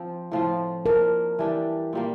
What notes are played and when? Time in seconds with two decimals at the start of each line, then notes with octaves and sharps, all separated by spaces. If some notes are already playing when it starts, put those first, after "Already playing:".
Already playing: F3 C4 F4
0.31 A2 F3 C4 F4
0.86 F3 A#3 D4 A#4
1.39 E3 G3 D4 G4
1.93 A#2 G3 A#3